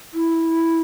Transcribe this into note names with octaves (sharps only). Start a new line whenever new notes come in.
E4